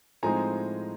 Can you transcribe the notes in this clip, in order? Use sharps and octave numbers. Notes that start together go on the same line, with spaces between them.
A2 F3 G#3 C4 D#4 G#5 A#5